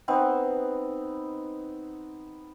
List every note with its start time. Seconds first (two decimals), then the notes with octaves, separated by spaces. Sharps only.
0.08 B3 C4 D#4